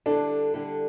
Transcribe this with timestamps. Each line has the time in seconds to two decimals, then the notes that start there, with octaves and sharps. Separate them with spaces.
0.06 D3 G3 D4 E4 A4
0.54 D3 G3 E4 A4